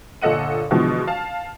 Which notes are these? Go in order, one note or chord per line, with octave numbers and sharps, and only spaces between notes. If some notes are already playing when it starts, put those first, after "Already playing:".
G1 A#2 A4 D#5 F#5 D#7
B2 D3 E3 F3 G#3 B3
F5 A5